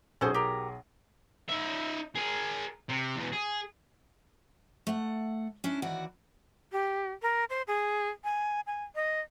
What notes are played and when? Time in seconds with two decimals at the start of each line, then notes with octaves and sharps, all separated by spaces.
0.21 B1 C#4 G#4 A4 C5 D#6
0.34 G4 A#4
1.48 D#4 E5
2.15 G#4 A#4
2.89 C3
3.16 E2 B2
3.32 G#4
4.87 A3 F#5
5.64 C#4 D4 E4
5.82 D#2 E3 F#4 D5 F#5
6.72 G4
7.22 A#4
7.50 C5
7.67 G#4
8.24 G#5
8.67 G#5
8.95 D#5